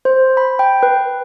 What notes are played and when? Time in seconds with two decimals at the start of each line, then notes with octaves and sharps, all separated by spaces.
0.05 C5
0.37 B5
0.59 G5
0.83 B4